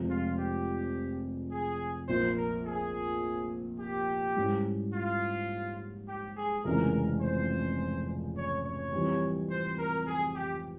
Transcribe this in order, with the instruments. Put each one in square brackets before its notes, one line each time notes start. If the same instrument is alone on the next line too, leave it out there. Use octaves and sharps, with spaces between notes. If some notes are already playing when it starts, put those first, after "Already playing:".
Already playing: [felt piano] F1 F2 C3 F3 G#3
[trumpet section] F4
G4
G#4
[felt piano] A#1 A#2 F3 [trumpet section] C5
[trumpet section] A#4
G#4
G4
[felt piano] G#2 G3 C#4 E4
[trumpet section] F4
G4
G#4
[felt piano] F1 F2 C#3 E3 G#3 [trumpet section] A#4
[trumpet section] C5
C#5
C#5
[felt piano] F2 E3 G3
[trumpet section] C5
A#4
G#4
G4